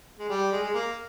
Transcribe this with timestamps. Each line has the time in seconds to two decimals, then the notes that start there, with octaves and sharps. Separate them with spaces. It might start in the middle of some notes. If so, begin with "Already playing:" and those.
0.19 G#3
0.29 G3
0.52 G#3
0.63 G#3
0.74 A#3